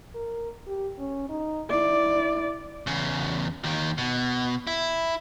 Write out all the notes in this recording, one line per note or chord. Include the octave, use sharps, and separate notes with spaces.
A#4
G4
C#4
D#4
E4 D5
E2 C#3
D#2 D#3
B2
E4